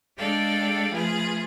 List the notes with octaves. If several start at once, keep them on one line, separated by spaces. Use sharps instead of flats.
G#3 D4 A4 D5 F5 G5
F3 A3 F4 G#4 B4